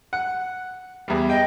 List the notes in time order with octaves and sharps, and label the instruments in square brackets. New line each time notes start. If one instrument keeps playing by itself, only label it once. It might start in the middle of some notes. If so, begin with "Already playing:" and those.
[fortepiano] F#5
E2 G3
[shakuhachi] D#5 [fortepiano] G5